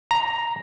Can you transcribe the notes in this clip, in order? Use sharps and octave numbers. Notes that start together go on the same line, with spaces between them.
A#5